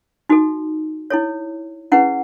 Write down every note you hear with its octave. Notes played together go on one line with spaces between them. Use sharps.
D#4 F#4 A4
E4 A4 C#5
C#4 E4 G#4 B4 F#5